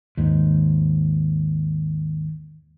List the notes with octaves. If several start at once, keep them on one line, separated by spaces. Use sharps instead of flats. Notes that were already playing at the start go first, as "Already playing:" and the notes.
D#2 G#2